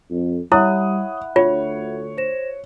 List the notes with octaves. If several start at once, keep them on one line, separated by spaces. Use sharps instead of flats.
F2
G3 E4 C#5 E5 F#5 B5 D#6 F#6
D2 F4 C#5
C5 A#6 E7